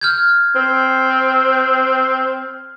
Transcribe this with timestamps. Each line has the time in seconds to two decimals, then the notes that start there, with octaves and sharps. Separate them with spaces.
0.01 F6 G6 G#6
0.55 C4